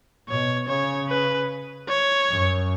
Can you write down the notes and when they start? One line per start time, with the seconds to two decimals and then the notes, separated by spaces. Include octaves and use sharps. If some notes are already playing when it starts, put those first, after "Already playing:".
0.29 B2 C#5
0.68 C#3 C#5
1.08 B4
1.88 C#5
2.29 F#2